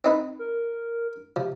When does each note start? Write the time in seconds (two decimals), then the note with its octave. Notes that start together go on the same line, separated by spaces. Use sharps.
0.04 C4 D#4 B4
0.39 A#4
1.36 C3 F3